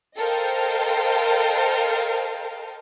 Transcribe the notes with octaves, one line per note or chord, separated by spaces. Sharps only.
A4 A#4 C5 D#5 F5 G5